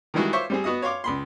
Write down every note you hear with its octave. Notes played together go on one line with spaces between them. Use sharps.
D#3 E3 G3 G#3 E4 F#4
F4 C5 C#5 E5 C#6 D6
G3 C4 G#4
B3 F#4 D#5 D#6
C#5 F5 C6 D6
C#2 B5 C6